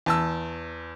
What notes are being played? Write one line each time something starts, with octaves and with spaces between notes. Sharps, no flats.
E2 A5 E6